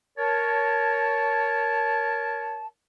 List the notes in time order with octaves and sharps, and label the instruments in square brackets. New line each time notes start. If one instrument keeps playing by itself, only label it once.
[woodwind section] A#4 C#5 A5